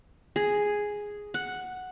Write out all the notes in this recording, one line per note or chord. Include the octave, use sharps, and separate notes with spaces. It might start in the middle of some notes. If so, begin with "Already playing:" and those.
G#4
F#5